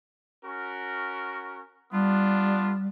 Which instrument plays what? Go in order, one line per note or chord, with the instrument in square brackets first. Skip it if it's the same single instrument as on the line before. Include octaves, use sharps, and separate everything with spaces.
[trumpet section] C#4 F#4 A#4
[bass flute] G3 [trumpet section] B3 D4 F4